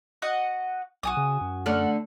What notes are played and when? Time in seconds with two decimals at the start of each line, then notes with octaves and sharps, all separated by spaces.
0.22 F#4 D#5 F#5
1.03 B1 F#4 G#5 D#6
1.17 C#3
1.41 F#2
1.66 D3 A3 D5 F#5 F6